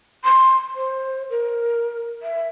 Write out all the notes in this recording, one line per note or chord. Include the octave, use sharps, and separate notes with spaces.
C6
C5
A#4
E5